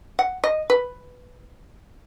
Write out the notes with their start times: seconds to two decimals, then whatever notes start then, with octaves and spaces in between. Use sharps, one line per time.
0.19 F#5
0.44 D#5
0.70 B4